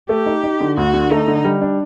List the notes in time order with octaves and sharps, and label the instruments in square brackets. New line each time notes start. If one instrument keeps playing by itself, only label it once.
[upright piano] A3 [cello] G4
[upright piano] D#4
D#4
D3
[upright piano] D2 [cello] F#4
[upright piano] D3
[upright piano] A3 [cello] D#4
[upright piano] D3
G3
D4